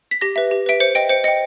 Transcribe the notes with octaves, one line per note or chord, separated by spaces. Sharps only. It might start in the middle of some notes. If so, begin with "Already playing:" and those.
B6
G4 A#6
B4 E5
G4
B4 E5 D7
C5 C#7
D#5 G5 D7
C5 C#7
D#5 G5 C#7